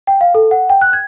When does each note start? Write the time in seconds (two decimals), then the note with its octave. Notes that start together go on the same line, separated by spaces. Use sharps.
0.07 G5
0.21 F5
0.35 A4
0.51 F#5
0.70 G5
0.81 F#6
0.93 G#6